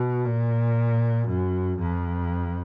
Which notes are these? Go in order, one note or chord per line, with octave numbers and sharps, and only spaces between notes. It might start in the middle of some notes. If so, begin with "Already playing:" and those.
Already playing: B2
A#2
F#2
F2